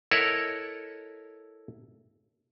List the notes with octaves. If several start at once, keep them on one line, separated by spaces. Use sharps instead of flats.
E4 A4 A#4 C#5 D#5 F#5